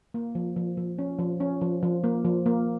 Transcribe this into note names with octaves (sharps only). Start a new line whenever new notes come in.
A#3
F3
F3
F3
C#4
F3
C#4
F3
F3
A#3
F3
A#3